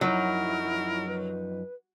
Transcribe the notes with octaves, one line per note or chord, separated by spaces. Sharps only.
F#2 F3 F#3 D#4 E4 A#4
B4